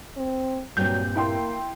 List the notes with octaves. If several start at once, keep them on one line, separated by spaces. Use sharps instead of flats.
C4
G2 A#2 F#3 C4 G6
A#3 E4 G5 C6